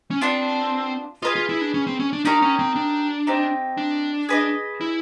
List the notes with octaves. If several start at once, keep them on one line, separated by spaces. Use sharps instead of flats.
C#4
B3 C4 D4 F4
F4 G#4 B4 D#5
F4
E4
D4
C#4
C4
C#4
D4
D4 D#4 G4 A#4 C#5
C#4
C4
D4
C4 D#4 G4
D4
G#4 B4 D#5
E4